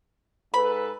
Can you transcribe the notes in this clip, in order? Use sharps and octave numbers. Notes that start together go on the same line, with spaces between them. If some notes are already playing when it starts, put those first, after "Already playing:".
G#2 A4 B4 B5